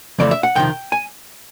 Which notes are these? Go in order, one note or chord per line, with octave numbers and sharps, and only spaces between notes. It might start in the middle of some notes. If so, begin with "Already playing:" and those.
F2 C#3 E3 A3 D5
E5
F#5
F2 C3 D#3 G5
G#5